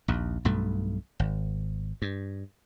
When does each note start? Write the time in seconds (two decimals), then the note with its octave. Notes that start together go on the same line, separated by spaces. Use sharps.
0.08 A#1 D#2
0.45 B1 G2 B2 A3
1.20 G#1
2.02 G2